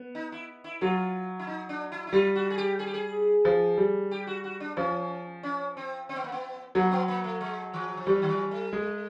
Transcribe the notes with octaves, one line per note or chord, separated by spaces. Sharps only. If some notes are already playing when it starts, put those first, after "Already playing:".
Already playing: B3
D#4
E4
E4
F#3 F4
E4
D#4
D4
E4
E4
G3 F4
F#4
G#4
G4
G#4
G4
G#4
F3
G3
G4
F#4
F#4
D4
F3 C#4
C#4
C4
C4
B3
A#3
B3
F#3 A#3
B3
A#3
A3
G#3
E3
F3
E3 G3
D#3
E3
A3
G#3